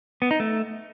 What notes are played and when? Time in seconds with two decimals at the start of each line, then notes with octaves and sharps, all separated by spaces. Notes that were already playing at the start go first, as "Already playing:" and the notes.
0.22 B3
0.31 D#4
0.40 A3